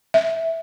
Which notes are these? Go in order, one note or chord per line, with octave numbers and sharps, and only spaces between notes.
E5